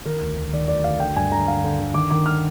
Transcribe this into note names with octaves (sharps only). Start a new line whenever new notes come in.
D#3 A#4
D2
D2
D#3 D5
D2 D5
D2 F5
D3 G5
G2 G#5
D3 A#5
D3 F5
D3
D3
D#3 D6
D#3 D6
F6